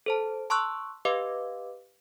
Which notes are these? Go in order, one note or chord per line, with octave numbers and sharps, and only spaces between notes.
A4 C5 A5
A5 C6 C#6 E6 F#6
G4 B4 D#5 F5 D6